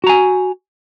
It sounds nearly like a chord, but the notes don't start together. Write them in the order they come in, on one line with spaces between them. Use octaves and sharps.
F#4 A#5 G#5